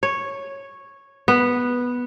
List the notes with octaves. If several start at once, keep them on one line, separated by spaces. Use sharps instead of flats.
C#5
B3